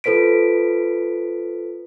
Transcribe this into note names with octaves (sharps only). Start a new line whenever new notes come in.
F4 A4 B4 C5 B6 D7